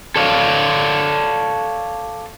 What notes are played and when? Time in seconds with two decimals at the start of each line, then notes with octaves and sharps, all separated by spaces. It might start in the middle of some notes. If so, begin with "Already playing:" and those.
0.16 A4 C#5 D5 F5